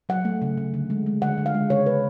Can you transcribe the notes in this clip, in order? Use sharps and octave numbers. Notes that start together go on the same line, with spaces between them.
F#3 F#5
A3
C#3
C#3
D3
G#3
G#3
D3 F#5
D3
F5
G#3
C#3 C#5
C#3 B4